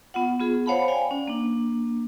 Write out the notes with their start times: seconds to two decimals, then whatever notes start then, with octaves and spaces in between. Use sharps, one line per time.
0.14 B3 F4 F#5
0.40 B3 F4 G#4
0.66 C5 C#5 F5 F#5 A5 B5
0.88 D5 F5 G5 G#5
1.11 C#4
1.28 A#3 D4